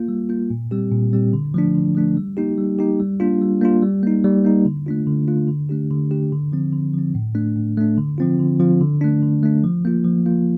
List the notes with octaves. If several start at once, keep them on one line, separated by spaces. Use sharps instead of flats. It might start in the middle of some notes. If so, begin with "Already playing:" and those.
Already playing: A#3 F4
G3
A#3 F4
A#2
G3 C4 G4
A#2
G3 C4 G4
D3
F3 A3 D4
D3
F3 A3 D4
G3
A#3 D#4 G4
G3
A#3 D#4 G4
G3
A#3 D4 F4
G3
A#3 D4 F4
G3
A#3 D#4
G3
A#3 D#4
D3
A3 D4 F4
D3
A3 D4 F4
D3
A3 D4 G4
D3
A3 D4 G4
D3
F3 C4
D3
F3 C4
A2
A3 D4
A2
A3 D4
D3
F3 C4 F4
D3
F3 C4 F4
D3
A3 D4
D3
A3 D4
F3
A#3 F4
F3
A#3 F4